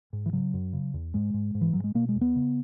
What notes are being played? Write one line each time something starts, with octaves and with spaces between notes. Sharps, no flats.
G#2
E3
C#3 F#3
F#2
C#3
E2
G#2 G#3
G#2
G#2
E3
G#2 F#3
G#3
B2 A#3
G#3
E2
B3
C#3